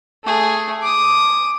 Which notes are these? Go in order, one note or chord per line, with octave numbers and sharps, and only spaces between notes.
A3 G#4
D6 D#6